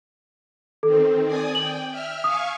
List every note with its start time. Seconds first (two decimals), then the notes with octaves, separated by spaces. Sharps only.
0.83 D#3 C4 A4
1.26 D5 G#5 D#6
1.55 G5 F#7
1.91 E5 F6
2.24 F5 G#5 C#6 D#6